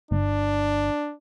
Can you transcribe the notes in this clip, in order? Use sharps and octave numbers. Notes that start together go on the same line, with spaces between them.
G1 D4